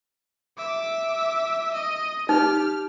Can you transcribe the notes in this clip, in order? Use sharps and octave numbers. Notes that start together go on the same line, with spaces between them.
E5 D6
D#5
D#4 G4 F6